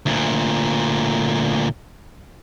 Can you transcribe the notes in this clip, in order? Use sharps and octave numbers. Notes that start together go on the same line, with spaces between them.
D2 A#2